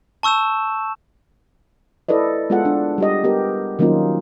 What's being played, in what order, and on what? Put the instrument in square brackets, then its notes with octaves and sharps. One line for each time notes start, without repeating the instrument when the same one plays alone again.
[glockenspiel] A5 C#6 E6 G6 E7
[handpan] E4 A4 B4 D5 D#5
G#3 B3 F4 G#4 A4 F#5
D4
G3 G4 D#5
B3 G4 A#4
D#3 F#3 A#3 C#4 D#4 F4